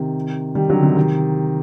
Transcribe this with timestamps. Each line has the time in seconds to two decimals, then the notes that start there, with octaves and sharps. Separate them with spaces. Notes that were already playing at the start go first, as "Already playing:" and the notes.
Already playing: C3 D#3
0.55 D#3 G3
0.69 D3 F#3
0.82 C3 D#3
0.96 C3 D#3